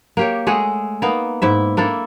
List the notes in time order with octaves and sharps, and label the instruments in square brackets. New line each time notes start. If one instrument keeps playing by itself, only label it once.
[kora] A#3 G4 C#5
G#3 A3 G#4 F#5
A#3 B3 D#4
G#2 E4 E5
A#3 D4 E4 A4